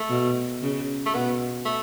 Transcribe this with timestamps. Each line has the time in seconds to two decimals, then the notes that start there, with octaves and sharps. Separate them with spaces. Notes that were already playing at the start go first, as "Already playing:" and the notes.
Already playing: A3
0.10 B2
0.62 C#3
1.06 A3
1.13 B2 B3
1.65 A3